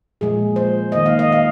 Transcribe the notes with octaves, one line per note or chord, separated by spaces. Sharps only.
A#2 F3 G#3 G#4
C5
D#3 A#3 D#5
F5
D#5
F5